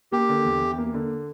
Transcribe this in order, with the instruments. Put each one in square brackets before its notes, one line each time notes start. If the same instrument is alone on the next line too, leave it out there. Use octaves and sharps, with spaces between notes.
[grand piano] A#3 [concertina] G4
[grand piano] D3
E2
E2
A#3
D3